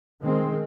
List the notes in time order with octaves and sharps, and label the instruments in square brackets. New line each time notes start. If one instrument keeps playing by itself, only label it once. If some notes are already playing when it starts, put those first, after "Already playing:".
[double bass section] D#3 G#3 C4